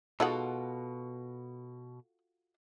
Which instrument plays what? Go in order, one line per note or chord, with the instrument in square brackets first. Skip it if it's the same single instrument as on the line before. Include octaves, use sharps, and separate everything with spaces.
[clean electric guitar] B2 [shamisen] G#3 D#4 F#5 [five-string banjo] F4 F#4 A4